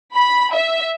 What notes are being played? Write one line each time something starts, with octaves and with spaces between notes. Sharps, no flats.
B5
E5